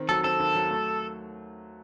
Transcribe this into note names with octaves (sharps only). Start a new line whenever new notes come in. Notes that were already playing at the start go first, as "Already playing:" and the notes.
Already playing: D#3 C4
F#3 A4
C4 A4
D#2
F#3
A3